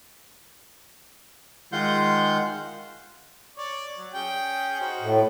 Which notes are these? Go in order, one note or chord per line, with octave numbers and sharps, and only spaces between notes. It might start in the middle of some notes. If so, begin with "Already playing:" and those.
D#3 G#3 F4 F#5 C6 G6
C#5 D5
F#3
C#4 G#4 G5
D#4 F#4 C5
A2